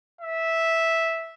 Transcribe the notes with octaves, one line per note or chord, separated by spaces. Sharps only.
E5